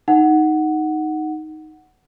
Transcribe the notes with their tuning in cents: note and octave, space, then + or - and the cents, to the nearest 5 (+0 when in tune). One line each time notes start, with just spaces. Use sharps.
D#4 +0 F#5 +0